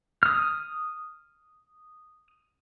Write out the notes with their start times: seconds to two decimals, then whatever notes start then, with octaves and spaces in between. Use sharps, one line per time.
0.23 D#6 F6